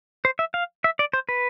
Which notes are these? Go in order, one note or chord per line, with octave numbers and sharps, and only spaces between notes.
C5
E5
F5
E5
D5
C5
B4